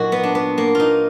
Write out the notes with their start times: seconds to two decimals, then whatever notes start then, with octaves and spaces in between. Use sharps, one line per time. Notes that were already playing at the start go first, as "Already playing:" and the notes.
Already playing: A#2 F#3 D#4 F#4
0.12 B3
0.23 D4
0.35 B3
0.58 A#3
0.75 D#4 F4